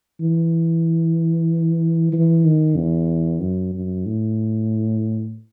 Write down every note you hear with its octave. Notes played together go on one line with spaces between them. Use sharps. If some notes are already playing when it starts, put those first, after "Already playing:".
E3
E3
D#3
E2
F#2
F#2
A2